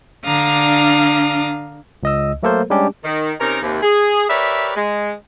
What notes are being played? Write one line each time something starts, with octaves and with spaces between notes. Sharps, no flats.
D3 D4 F5 A#5 D#6
C#2 D#5 E6
F#3 A3 A#3 A4 A#4 C5
G3 G#3 C#4 D4 G4
D#3
C3 C#4 D#4 A#4
D#2 C3
G#4
G4 A#4 B4 C#5 D5 E5
G#3